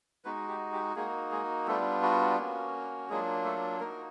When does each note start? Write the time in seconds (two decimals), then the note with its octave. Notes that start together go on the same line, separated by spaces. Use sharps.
0.25 G#3 B3 D#4 F#4 B4
0.49 G4
0.73 G4
0.96 G#3 A#3 D#4 F#4 G#4
1.31 G#3 G#4
1.67 G3 A3 B3 D4 F4 A4
2.03 F#4
2.38 A#3 C#4 F#4
3.09 F#3 G#3 A#3 D4 F4 G#4
3.44 A3 A4
3.80 A#3 D#4 F#4 A#4